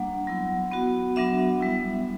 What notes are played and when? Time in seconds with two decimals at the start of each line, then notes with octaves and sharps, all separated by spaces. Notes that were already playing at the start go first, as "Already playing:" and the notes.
Already playing: G3 A#3 D4 F#5
0.27 F#3 B3 E4
0.72 B3 F#4
1.16 F#3 B3 D4 F#4 E5
1.60 G3 B3 E4